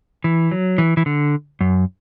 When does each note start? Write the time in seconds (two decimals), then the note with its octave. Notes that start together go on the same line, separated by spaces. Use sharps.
0.24 E3
0.51 F#3
0.78 E3
0.97 E3
1.06 D3
1.61 F#2